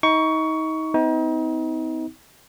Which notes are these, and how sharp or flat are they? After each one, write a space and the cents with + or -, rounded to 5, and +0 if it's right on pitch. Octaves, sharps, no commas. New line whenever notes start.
D#4 +30 C#6 +15
C4 -45 D#4 +35